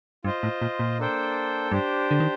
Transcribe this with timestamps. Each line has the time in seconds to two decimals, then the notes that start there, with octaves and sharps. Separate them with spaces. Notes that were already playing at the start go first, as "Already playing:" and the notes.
0.25 G2 F4 C5 D#5
0.43 A2
0.62 A#2
0.79 A#2
0.98 A#3 D4 A4 C5 G5
1.71 G2 D4 G4 C5
2.11 D3
2.20 D#3